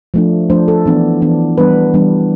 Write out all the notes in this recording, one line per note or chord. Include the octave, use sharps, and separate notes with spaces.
F3 A3 D4
F3 A3 D4 C5
A4
E3 B3 D4
E3 B3 D4
E3 G3 B3 D4 B4
E3 G3 B3 D4